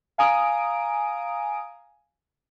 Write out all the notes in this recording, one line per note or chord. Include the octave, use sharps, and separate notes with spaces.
F5 G#5 A#5 D#6 D7